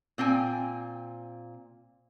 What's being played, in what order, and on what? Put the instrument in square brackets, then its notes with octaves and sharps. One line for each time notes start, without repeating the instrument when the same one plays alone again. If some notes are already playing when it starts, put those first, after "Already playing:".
[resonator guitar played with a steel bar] A#2 C4 G5 G#5